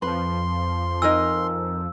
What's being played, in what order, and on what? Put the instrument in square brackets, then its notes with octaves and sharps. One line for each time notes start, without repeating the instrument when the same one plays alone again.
[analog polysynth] F2 F3 [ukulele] B4 [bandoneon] C6
[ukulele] D#4 A#4 G#5 [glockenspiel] E6